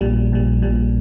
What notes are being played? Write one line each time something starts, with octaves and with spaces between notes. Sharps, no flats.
A#1 A#2 G3
A#1 A#2 G3
A#1 A#2 G3